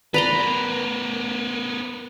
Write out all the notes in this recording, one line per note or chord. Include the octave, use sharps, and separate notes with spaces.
B4 D5 A#5 C6
B3 A#4